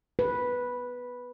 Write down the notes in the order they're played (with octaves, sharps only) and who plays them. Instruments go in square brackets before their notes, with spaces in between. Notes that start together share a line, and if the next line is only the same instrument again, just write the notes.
[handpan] B4